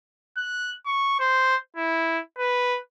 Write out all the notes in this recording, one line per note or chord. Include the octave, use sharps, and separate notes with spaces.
F#6
C#6
C5
E4
B4